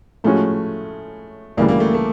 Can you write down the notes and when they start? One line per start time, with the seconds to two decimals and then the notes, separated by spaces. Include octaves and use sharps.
0.24 A2 F3 G#3 A3 C#4 F#4
1.57 D2 C#3 E3 G3 A#3
1.69 A#3
1.80 A3
1.94 A3